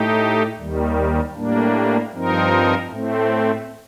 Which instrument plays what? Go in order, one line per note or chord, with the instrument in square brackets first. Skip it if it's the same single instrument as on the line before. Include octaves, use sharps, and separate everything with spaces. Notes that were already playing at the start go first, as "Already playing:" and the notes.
Already playing: [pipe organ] A2 A3 D#4 G4
D#2 D#3 G3
A2 G3 A#3 D4
G2 F3 C4 D#4 A#4
A2 A3 C4